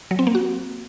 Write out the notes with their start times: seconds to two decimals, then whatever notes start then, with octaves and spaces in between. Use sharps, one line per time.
0.11 F#3
0.19 C4
0.27 A#3
0.35 F#4